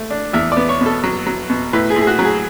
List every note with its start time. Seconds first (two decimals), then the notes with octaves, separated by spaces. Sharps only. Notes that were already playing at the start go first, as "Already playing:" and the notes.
Already playing: A3
0.11 D4
0.33 E2 E5
0.52 B3 D5
0.69 C#5
0.81 B2
0.86 A4
1.04 F#3
1.27 F#3
1.50 B2
1.73 A2 B4
1.90 G#4
1.96 A2
2.02 G#4
2.07 F#4
2.19 F#3
2.25 G#4